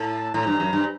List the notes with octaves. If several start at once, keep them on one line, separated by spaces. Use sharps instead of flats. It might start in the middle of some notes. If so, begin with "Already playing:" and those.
Already playing: A2 A5
A2 A#5
G2
F#2
G2